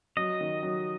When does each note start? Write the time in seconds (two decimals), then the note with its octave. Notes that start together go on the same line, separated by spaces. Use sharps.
0.17 F#3 D#5
0.41 D#3
0.63 F#3